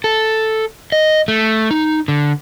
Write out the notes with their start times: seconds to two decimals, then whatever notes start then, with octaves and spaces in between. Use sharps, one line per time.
0.04 A4
0.92 D#5
1.28 A3
1.71 D#4
2.08 D3